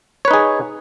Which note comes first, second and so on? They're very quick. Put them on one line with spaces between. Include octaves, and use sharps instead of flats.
C#5 B4 D#4 G#4